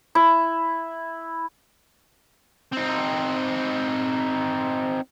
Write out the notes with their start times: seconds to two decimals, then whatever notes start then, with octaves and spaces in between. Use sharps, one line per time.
0.15 E4
2.72 C4 D#4